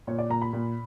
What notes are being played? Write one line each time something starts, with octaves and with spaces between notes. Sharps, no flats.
A#2 C#5
D5
A#2 A#5
B5
A#2